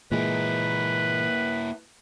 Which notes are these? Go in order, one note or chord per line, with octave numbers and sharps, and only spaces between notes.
A#2 E3 G#3 A#3 E4 B4